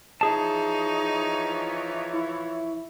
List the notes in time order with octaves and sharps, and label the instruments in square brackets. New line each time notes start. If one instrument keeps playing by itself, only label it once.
[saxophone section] E3 F3 C#5 [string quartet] D#4 [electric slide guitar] G#4 A5
[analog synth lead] E4